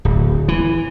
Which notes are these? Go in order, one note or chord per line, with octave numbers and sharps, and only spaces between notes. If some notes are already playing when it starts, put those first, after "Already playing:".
D1
E3